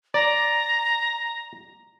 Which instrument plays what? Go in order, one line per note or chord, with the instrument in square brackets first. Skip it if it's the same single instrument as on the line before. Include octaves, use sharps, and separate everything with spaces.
[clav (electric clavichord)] D5 [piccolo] A#5